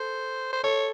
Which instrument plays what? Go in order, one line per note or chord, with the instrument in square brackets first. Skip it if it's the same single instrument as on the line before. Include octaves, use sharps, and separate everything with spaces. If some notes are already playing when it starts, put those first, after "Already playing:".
Already playing: [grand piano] A4 [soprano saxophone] C5
[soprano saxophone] C5
[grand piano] A4 [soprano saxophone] C#5